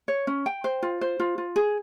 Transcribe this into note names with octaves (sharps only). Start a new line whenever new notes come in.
C#5
C#4
G5
C5
F4
C5
F4
F4
G#4